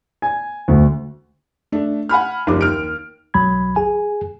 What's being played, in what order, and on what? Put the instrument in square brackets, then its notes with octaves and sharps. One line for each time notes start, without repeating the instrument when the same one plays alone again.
[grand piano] G#5
D2
[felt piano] A3 D4
F#5 G#5 B5 F6
F#1 D#2 F3 G3 D6
D#2 F6 D7
[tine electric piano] B1 F#3 B5 G#6
G#4 G#5